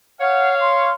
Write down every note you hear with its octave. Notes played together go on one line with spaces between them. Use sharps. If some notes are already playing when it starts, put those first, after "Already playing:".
C#5 F5 F#5
C6